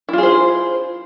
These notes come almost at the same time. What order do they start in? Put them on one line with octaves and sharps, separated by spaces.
E4 F4 G#4 C5